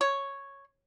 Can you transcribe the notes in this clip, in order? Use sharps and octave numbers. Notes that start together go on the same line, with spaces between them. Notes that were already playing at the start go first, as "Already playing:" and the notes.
C#5